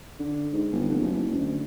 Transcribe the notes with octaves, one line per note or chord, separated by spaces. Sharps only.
D3
G#2
G1
F1
F#1
D2